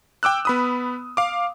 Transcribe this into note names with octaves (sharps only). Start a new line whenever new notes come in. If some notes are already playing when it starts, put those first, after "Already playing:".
G5 D6 E6 F#6
B3 B5 D#6
F5 D6